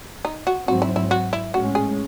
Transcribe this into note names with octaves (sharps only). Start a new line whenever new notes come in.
D#4
F#4
G#2 F#3 C4 F#4
E4
E4
F#4
E4
A2 G#3 C#4 F#4
G#4